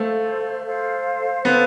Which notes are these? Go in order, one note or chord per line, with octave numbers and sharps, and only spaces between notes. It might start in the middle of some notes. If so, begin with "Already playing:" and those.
Already playing: A3 A4 C5 F5
A4 C5 F5
B3 A4 C5 F5